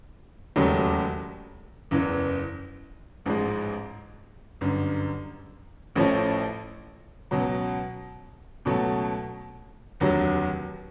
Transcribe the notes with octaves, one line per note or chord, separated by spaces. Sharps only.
E1 D#2 C#3 F#3 A3
F#1 E2 C#3 E3
A1 G#2 F3 G#3
G1 F#2 D3
A1 A2 F3 A3 C#4
C#2 B2 F#3
C#2 B2 F#3 A3
F1 D#2 D3 F#3